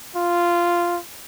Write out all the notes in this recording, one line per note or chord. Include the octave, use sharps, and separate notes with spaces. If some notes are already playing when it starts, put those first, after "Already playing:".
F4